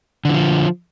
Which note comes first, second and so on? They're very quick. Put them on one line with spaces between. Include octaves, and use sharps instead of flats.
D3 E3 F3